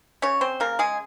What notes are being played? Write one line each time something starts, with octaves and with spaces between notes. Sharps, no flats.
C#3 C#4 C#5
C4 C5
C#3 A#3 A#4
G#3 G#4